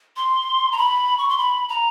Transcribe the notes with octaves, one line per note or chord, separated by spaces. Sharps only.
C6
A#5
B5
C#6
C6
B5
A#5